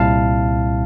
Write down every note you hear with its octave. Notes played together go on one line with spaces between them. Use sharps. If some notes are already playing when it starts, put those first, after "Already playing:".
Already playing: C2 A#2 G3 C4 E4 F5 A5